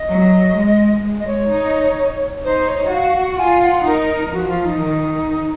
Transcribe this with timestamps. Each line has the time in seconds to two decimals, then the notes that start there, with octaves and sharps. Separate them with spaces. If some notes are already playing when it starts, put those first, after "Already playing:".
Already playing: D#5
0.09 F#3
0.56 G#3
1.04 G#3
1.20 D#5
1.27 C#5
1.50 D#4
2.44 D#4 C5
2.68 C#5
2.87 F#5
2.92 F#4 F5
3.15 F#5
3.39 F4 G#5
3.62 F#5
3.86 D#4 A#4
4.33 F3 F#4
4.48 F4
4.65 D#4
4.80 D#3